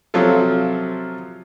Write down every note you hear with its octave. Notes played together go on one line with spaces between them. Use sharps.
C3 F3 F#3 F4 A4